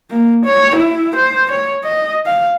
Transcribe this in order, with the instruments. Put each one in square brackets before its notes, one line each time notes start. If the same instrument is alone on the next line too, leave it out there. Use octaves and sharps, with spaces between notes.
[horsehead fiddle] A#3
C#5
E4
C5
C#5
D#5
F5